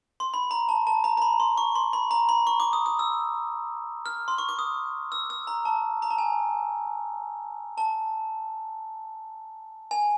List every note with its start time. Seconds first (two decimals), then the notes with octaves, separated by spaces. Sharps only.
0.20 C6
0.34 B5
0.51 A#5
0.69 A5
0.87 A5
1.04 A#5
1.17 A#5
1.22 B5
1.40 C6
1.58 C#6
1.75 C6
1.93 B5
2.11 A#5
2.29 B5
2.47 C#6
2.60 D6
2.73 D#6
2.86 D#6
2.99 E6
4.06 F6
4.28 C6
4.38 C#6
4.49 D6
4.59 D#6
5.12 E6
5.30 E6
5.47 A#5
5.65 A5
6.02 A#5
6.10 A5
6.18 G#5
7.78 A5
9.91 G#5